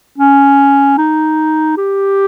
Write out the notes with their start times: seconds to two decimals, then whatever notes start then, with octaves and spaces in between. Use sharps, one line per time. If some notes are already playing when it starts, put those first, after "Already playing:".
0.18 C#4
0.98 D#4
1.77 G4